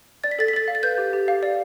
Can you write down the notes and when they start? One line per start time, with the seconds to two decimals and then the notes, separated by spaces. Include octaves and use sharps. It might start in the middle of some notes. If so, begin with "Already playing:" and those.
0.24 D5 A6
0.31 B6
0.39 A4 A6
0.48 B6
0.53 A4 A6
0.68 F5
0.75 A6
0.83 B4 G6
0.98 G4
1.13 G4
1.28 F5
1.43 D5